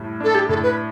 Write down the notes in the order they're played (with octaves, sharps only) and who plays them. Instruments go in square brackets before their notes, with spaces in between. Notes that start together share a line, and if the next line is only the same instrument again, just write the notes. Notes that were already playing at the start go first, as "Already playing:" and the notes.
Already playing: [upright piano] A2 G3
[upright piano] D4 [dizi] A4
[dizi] G4
[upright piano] A2 [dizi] A4
[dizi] B4